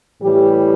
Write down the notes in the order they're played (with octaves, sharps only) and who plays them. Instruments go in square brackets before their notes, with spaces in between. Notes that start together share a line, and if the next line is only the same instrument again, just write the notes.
[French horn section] A2 E3 G3 G4